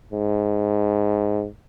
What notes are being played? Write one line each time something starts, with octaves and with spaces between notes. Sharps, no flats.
G#2